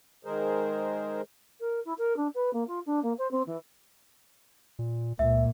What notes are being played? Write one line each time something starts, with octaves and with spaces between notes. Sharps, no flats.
D#3 G#3 G#4 A#4 C5
A#4
E4
A#4
D4
B4
A#3
F4
D4
A#3
C5
C4
E3
A#2
C#2 A#2 E5